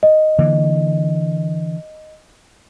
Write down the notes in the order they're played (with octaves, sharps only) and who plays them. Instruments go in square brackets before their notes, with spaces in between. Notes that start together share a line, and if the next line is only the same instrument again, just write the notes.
[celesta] D#5
[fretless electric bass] D3 E3 A#3